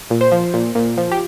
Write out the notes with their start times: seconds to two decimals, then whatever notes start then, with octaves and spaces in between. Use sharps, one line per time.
0.10 A#2
0.21 C5
0.32 F3
0.54 A#2
0.75 A#2
0.97 F3
1.11 G4